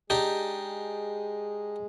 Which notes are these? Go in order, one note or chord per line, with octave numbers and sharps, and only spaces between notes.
G#3 D4 D#4 G4 G#4